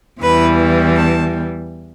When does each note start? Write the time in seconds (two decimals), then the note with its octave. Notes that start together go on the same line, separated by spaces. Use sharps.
0.20 E2 E3 G3 B4
0.96 A5